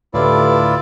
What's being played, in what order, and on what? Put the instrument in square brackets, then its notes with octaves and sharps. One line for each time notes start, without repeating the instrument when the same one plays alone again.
[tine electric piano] D2 A2 [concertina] E4 F4 D5 [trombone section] G4 A4 B4